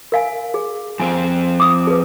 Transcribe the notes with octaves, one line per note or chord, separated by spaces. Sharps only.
A#4 F5 G#5
G#4
F2 C4 G#5
D6 D#6
G#4 B4